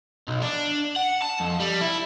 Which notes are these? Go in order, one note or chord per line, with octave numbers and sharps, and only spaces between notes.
B1
D4
F#5
A5
F2
G3
E4